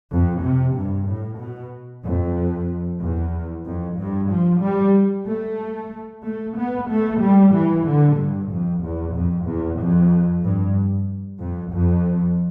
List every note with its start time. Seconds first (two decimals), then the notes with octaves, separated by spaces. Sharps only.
0.10 F2
0.42 C3
0.75 G2
1.07 A2
1.39 B2
2.04 F2
3.01 E2
3.65 F2
3.98 G2
4.30 F3
4.62 G3
5.27 A3
6.24 A3
6.56 B3
6.89 A3
7.21 G3
7.53 E3
7.85 D3
8.17 G2
8.50 F2
8.82 E2
9.14 F2
9.46 E2
9.79 F2
10.43 G2
11.40 F2
11.72 F2